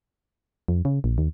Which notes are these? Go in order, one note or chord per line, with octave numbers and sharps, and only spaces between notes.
F2
C#3
A#1
D#2